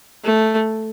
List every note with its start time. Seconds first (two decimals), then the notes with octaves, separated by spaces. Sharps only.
0.24 A3